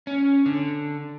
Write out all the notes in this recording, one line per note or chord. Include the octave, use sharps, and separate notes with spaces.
C#4
D3